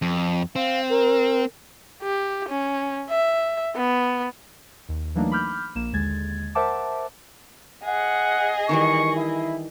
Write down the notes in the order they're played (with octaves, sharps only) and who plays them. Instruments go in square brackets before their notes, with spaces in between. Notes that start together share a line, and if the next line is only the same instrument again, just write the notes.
[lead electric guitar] F2
[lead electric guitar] C4 [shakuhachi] F5
[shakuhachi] A#4
[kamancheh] G4
C#4
E5
B3
[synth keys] D#2
E3 F#3 A3 A#3 D4 D#4
B5 D6 F6 G6
A#1 A#3 E7
D#2 D3 G#3 G#6 A6
A#4 C5 E5 F#5 A5 D6
[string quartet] G#4 D#5 [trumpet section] F#5
[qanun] D#3 E3 G3 [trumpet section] C#6
[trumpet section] E4